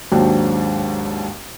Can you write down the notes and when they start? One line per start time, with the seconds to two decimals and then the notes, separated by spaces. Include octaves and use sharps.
0.12 D#2 G#2 F#3 D4 G5